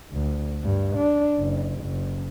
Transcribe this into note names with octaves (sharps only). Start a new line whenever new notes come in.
D2
G2
D4
F#1
F#1